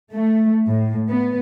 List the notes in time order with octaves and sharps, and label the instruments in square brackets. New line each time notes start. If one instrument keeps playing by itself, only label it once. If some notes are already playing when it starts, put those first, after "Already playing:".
[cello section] A3
A2
B3